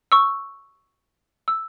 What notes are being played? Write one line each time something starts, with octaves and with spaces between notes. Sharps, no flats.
C#6 E6
E6